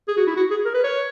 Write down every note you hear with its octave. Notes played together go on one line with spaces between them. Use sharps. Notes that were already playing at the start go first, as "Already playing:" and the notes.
G#4
F#4
E4
F#4
G#4
A#4
B4
C#5